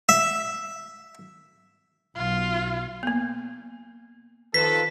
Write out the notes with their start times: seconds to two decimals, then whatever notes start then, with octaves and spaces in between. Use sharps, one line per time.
0.09 E5
2.16 B1 F4
3.03 A#3 B3
4.54 D#3 F3 A4 B4 B6